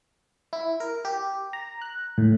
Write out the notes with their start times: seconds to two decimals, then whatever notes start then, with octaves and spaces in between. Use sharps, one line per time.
0.53 E4
0.80 A#4
1.05 G4
1.53 A#5
1.82 F#6
2.18 A2